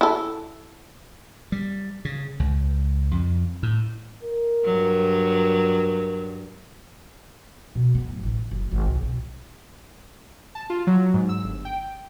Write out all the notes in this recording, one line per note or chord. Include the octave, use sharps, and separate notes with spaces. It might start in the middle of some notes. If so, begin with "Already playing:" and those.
E4 A4
G3
C#3
C#2
F2
A2
A#4
G2 F#3
B2
B3
D1
A1
C#3
F#1
G#1
C2
B1
A5
F4
F#3
G#2
E6
G1
G5